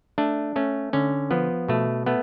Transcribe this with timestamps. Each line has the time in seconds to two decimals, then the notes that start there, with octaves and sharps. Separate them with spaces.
0.18 A3 D4
0.56 A3 C#4
0.93 D3 C#4
1.31 F3 B3
1.68 B2 A3
2.06 A3 B3